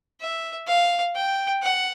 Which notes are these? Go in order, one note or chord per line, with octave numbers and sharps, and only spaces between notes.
E5
F5
G5
F#5